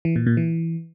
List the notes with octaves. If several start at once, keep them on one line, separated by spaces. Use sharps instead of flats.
E3
A#2
A#2
E3